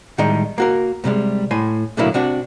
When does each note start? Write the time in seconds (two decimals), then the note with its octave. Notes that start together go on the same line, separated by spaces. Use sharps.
0.18 A2 D#3 G3 G#3 D#4
0.58 A#3 F#4 A#4
1.04 A2 C3 G3 G#3
1.51 A2 G#5 C6
1.97 B1 A2 D3 F#3 A#3 E4
2.14 C3 D4 F#4